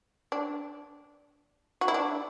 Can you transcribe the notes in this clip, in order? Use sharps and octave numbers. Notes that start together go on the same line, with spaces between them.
D4
F#4
E4
D4